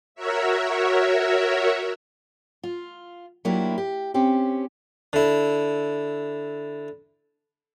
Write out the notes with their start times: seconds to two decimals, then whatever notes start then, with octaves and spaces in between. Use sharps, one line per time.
0.15 F#4 A#4 C#5 E5
2.63 F4
3.45 F#3 A#3 D4 E4 F4 G4
3.78 G4
4.14 C4 C#4 G4
5.13 D3 E4